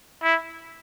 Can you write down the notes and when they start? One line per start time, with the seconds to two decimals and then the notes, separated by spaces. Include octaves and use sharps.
0.23 E4